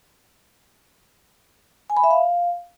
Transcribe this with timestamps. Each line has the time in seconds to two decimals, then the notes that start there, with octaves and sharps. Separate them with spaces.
1.90 G#5
1.97 B5
2.04 E5
2.11 F5